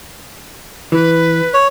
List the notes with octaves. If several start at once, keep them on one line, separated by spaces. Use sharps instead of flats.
E3 B4
C#5